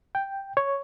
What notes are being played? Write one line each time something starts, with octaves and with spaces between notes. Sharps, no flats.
G5
C#5